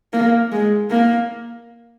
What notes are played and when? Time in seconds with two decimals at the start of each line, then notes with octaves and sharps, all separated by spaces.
0.13 A#3
0.52 G#3
0.90 A#3